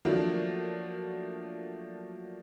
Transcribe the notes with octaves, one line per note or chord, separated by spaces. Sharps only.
F3 F#3 A3 A#3 D4 F4